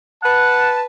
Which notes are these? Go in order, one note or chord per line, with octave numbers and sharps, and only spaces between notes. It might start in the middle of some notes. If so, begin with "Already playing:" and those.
B4 F#5 A5